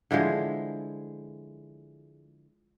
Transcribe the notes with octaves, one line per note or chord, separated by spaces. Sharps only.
D3 E3 F3 G#3